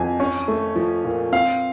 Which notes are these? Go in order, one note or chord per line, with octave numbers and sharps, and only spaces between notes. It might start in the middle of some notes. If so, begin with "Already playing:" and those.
Already playing: F2 G#5
C#4
A3
F3
A#2
C4 F5